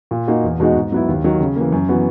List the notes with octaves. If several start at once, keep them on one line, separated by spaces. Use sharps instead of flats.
A#2
A#3 D#4 F#4
E2
B2 G#3 D#4 F#4
G#2
F#3 B3 E4
D#2
D#3 F#3
C#3
E3 A#3
F#2
E3 B3 F#4